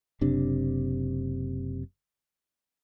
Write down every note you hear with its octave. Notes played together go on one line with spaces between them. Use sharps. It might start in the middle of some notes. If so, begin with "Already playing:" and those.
F#1 C3 D4